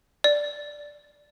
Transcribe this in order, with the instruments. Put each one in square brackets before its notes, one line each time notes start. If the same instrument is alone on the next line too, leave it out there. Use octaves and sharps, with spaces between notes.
[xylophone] D5